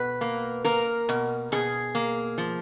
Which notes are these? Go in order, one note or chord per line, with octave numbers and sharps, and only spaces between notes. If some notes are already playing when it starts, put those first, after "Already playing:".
Already playing: B2 B4
A#3
A#3 A#4
B2
B2 G#4
A#3
F3